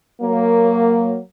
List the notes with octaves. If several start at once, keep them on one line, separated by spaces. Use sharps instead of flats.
F#3 A#3